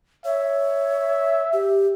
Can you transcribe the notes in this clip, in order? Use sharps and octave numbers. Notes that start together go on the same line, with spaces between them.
C#5 E5
G4